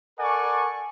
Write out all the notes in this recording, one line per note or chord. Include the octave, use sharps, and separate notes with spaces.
A4 A#4 D5 F#5 G#5 C#6